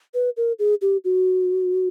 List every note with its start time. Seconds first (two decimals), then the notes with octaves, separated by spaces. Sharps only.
0.14 B4
0.37 A#4
0.59 G#4
0.82 G4
1.05 F#4